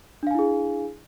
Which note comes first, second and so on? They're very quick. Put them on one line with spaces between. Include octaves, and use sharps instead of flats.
D4 F5 G#5 E4 G#4